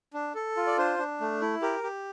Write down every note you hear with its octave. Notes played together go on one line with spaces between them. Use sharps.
D4
A4
F4
D5
D4 C5
D4
A3
E4
G4 A#4
G4